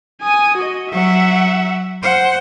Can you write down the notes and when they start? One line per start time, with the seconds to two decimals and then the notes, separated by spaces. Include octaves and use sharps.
0.21 G#5 D#6
0.57 F#4 D#5
0.92 F#3 E5 F#5
2.03 C5 F#5